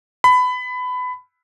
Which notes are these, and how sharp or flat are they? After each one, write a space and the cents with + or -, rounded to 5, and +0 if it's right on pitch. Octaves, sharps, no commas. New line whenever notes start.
B5 +20